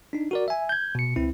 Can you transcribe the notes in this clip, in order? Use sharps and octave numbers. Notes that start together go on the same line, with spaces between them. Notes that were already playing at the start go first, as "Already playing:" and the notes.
D4 D#4
F#4 A#4 D5
E5 G#5
G6 G#6
B2 C#7
C#2 C4 E4